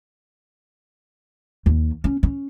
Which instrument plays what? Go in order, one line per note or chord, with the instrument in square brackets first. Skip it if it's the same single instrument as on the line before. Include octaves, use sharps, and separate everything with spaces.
[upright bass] D#2
C#4
C#4